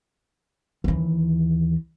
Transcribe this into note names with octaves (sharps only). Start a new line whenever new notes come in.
D#2 E3